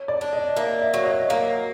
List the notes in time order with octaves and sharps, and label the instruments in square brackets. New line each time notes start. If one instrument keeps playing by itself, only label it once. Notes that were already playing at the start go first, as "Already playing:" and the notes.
Already playing: [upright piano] C#5
D5
[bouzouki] D4
[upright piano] D#5
[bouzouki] A#3 [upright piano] E5
[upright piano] E5
[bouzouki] F#3
[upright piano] D#5
[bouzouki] A#3 [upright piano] F5